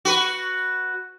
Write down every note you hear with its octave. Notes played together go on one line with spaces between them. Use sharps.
F#4 B4